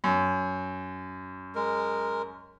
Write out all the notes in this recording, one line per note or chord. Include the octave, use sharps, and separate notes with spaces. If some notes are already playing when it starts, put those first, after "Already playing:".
F#2
G#3 A#4